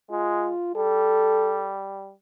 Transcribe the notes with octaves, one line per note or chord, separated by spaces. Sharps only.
G#3 F4
G3 A4